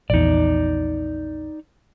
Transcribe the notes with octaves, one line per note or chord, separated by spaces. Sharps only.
A#1 E2 D#4 D5